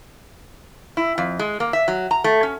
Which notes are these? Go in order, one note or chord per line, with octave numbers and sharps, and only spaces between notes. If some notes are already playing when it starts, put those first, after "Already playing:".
E4
F2
G#3
A#3
E5
F#3
A#5
A3
C#4